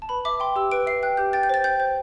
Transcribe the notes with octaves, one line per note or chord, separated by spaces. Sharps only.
A5
B4 B5
E5 D6
G5 C6
G4 E6
B4 D7
E5 C7
G5 F#6
G4 G6
G5 A6
G6
C5 A6
G5 G6
C5